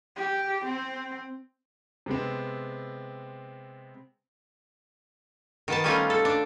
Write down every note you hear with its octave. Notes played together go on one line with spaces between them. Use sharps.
G4
C4
C3 G#3 B3 C4
D#3 B3 A5
G3 A3 C#4 D#4 F4
A4
D4